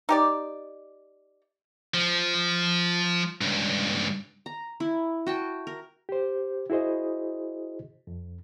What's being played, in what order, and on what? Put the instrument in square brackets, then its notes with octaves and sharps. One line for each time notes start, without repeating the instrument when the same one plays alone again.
[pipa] D#4 G4 D5
[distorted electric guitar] F3
C#2 G2
[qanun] A#5
E4
F#4 G5 A5
A#4
[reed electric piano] G4 C5
E4 F#4 G#4 C5 D#5
F2